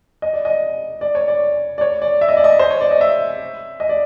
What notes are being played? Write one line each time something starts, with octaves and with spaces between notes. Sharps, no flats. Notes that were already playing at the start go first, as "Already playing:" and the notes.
D#5
D5
D#5
D5
C#5
D5
D5
C#5
D5
E5
D#5
D5
D#5
C5
C#5
D5
D#5
E5
D#5
D5